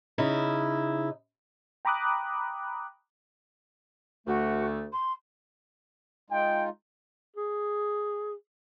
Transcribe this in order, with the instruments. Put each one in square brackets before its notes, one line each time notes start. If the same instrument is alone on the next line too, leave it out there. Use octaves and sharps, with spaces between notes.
[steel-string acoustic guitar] C#3 D#4 E4
[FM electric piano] G5 A#5 B5 D6 D#6 F#6
[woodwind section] D2 A3 [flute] F#4
[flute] C6
[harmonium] G#3 D#4 F4 [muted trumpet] G5
[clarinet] G#4